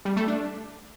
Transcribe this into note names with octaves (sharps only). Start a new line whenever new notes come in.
G3
A3
D4